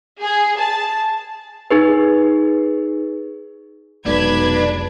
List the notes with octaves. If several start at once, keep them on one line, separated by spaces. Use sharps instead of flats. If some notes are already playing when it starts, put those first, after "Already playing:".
G#4
A5
D#4 G#4 B4
F1 B1 G#3 D4 B4 G#6